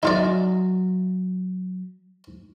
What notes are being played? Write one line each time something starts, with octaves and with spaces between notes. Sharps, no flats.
F#3 D#4 F4 F#4 D5 E5